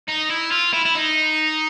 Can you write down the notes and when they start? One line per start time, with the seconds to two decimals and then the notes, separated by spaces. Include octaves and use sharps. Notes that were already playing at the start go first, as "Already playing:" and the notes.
0.08 D#4
0.30 E4
0.51 F4
0.73 E4
0.85 E4
0.95 D#4